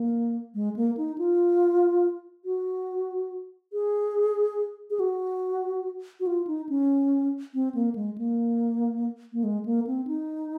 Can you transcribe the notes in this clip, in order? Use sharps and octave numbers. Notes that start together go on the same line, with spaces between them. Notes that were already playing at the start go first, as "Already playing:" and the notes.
Already playing: A#3
G#3
A#3
D#4
F4
F#4
G#4
G#4
F#4
F#4
F4
D#4
C#4
C4
A#3
G#3
A#3
A#3
G#3
A#3
C4
D#4